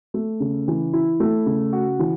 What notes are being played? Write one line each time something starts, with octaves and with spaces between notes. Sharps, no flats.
A3
C#3
E3
E4
A3
C#3
F#4
E3